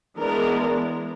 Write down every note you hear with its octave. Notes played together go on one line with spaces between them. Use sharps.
E3 G#3 B3 D4 A#4